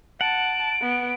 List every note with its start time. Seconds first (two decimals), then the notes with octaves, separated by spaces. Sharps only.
0.21 F#5 A5 D7
0.81 B3